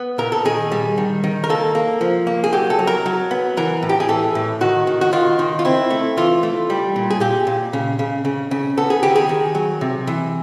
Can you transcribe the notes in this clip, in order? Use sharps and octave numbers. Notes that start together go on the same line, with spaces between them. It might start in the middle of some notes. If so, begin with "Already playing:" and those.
Already playing: B3
A#2 A#4
A4
D#3 G#4
G3
D#3
D#3
A#4
A#3 A4
A#3
F3
A#3
G#4
F#3 G4
A4
F#3
A#4
F#3
B3
E3 A#4
A2
G4
G#4
E3 A4
A2
D#3 F#4
D#3
F#4
D#3 F4
D#3
F4
C4 E4
A3
E3 F4
A3
G3
A#2
G#4
A#2 G4
A#2
C#3
C#3
C#3
C#3
B3 A4
G#4
D#3 G4
G#4
D#3
F#3
C3
E3